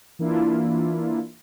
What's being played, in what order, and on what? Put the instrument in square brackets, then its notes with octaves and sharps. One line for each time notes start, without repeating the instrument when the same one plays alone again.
[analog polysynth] E3 A#3 D4 E4 F4